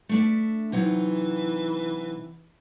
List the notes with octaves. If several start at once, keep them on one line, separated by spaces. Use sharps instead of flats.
A3 D4 E5
C3 E3 F#3 D#4